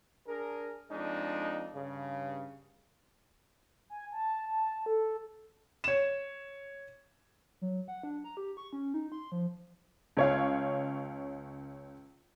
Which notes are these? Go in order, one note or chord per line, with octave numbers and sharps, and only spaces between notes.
D4 G#4 A#4
F2 G#3 D4 D#4
G2 C#3
G#5
A5
A5
A4
C#5 E7
F#3
F#5
D4
A#5
G4
C#6
C#4
D#4
C6
F3
C#2 C#5 F5